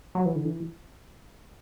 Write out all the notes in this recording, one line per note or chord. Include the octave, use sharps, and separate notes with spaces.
F#3
E3
D3
E3